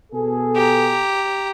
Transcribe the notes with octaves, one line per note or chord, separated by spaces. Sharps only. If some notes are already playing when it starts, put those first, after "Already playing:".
B2 G#4 A4
G4 A#5